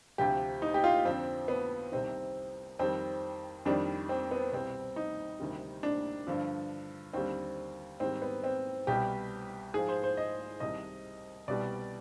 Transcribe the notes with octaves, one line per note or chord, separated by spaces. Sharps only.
D2 C3 F3 G4
D#4
G4
F4
F2 D3 F3 C4
B3
C2 C3 D#3 C4
F2 D#3 G3 C4
F2 D#3 G3 D4
C4
B3
C2 B2 G3 C4
D#4
D2 C3 D#3 G3
D4
G2 D3 F3
D#2 D3 G3 C4
G#2 D#3 G3 C4
B3
C4
C2 B2 G3 G4
G#2 F3 G#4
C5
C5
D#5
C2 C3 D#3 D#5
C2 B2 G3 D5